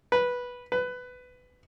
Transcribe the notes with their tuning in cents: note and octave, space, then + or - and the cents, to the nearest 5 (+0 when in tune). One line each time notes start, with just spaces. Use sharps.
B4 -10
B4 +15